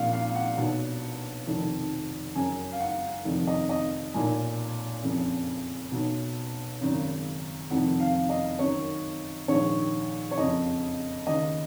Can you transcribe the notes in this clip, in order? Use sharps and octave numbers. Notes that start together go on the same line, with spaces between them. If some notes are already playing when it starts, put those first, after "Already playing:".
Already playing: A#1 A#2 F5 F#5
F5
F#5
B1 B2
F1 F2 D#3
F#1 F#2 C#3 G#5
F5
F#5
F1 F2 D#3
D#5
D#5
B1 A#2 G#5
F#1 F2 C#3
B1 B2
G#1 F#2 C#3
F1 F2 D#3 F#5
F5
D#5
F#1 F#2 D#3 C#5
A#1 G#2 D#3 C#5
C#5
F#1 F2 C#3 D#5
D#2 C#3 D#5